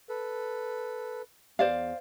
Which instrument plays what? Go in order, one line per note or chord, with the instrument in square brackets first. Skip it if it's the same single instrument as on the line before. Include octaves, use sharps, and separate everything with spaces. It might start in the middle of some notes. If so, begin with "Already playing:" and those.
[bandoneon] A4 B4
[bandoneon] E2 [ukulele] C5 D5 F5